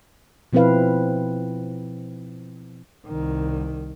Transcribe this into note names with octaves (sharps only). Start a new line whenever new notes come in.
B2 F3 C4 E4 B4 F5
C2 D#3